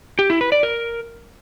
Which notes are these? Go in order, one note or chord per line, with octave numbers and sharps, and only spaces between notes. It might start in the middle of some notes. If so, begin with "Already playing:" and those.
G4
E4
B4
D5
A#4